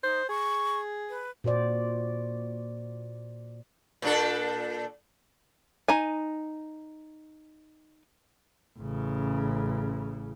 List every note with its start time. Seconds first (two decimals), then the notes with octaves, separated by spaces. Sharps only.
0.03 D#4 C5
0.29 G#4 C#6
1.09 B4
1.44 A#2 F#4 C5 D5
4.02 A#2 D4 A4
5.88 D#4 G#5
8.78 A1 C#3